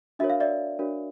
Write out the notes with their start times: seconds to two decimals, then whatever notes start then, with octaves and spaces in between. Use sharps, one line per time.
0.19 D4 F#4 A#4 C#5 E5
0.30 F5
0.40 D5 E5
0.79 D4 F#4 A#4 C#5